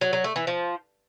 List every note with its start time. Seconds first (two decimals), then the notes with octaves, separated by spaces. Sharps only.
0.01 F#3
0.13 F#3
0.24 A3
0.36 E3
0.47 F3